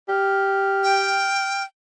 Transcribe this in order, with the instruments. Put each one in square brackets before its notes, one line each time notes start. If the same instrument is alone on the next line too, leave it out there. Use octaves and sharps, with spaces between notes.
[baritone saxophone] G4 [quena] F6
[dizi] G5